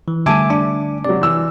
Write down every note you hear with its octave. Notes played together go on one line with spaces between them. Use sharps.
E3
D3 G3 A3 E5 G#5 A5 D6 D#7
D4 D6
C3 F#3 D5
E3 E6